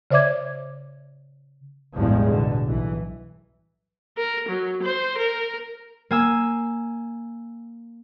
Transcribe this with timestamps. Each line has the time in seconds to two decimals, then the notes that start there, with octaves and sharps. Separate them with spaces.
0.11 C#3 C5 D5 E5 D6 G#6
1.96 A1 E2 G2 C3 F3 G#3
2.25 B2 D3
2.67 B1 E3
4.17 A#4
4.49 F#3
4.83 C5
5.18 A#4
6.11 A#3 G#5 E6